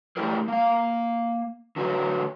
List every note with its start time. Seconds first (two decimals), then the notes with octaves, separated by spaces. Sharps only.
0.17 A3 E4 G4 G#4 A#4
0.48 A#3 F5
1.76 D3 F#4 B4 C#5